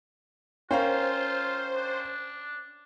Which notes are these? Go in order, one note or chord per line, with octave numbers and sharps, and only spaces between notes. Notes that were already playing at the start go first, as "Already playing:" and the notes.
C#4 F4 A#4 C5 F5 G5
D4